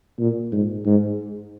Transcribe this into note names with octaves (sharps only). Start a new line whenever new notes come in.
A#2
G#2
G#2